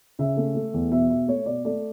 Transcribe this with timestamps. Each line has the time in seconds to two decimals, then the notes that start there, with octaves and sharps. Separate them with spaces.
0.19 C#3 E5
0.37 A3
0.55 A3
0.74 E2
0.91 B2 E5
1.10 B2 E5
1.28 A3 C#5
1.46 B2 D5
1.65 A3 D5